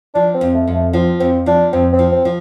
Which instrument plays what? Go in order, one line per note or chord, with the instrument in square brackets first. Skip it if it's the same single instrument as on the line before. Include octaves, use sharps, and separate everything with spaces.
[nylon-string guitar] F3 [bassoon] D4
[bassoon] C4
[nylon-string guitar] F2
[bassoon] A3
[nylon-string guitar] F2
[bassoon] A3
[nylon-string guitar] F3 [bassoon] C4
[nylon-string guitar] F2 [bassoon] C4
[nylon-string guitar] F3 [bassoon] D4
[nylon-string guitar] F2 [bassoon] C4
[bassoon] C4
[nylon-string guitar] F3
[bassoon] C4
[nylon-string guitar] F3